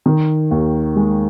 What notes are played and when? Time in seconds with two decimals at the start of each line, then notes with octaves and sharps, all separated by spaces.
0.06 D#3
0.51 D#2
0.96 G#3